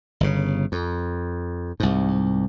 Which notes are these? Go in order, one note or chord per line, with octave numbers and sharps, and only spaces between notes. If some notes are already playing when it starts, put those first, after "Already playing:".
G1 C#3
F2
C2 G#2